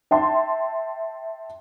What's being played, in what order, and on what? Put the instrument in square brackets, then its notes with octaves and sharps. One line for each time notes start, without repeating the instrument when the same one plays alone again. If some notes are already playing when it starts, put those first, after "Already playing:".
[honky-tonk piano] E5 G5 A5 C6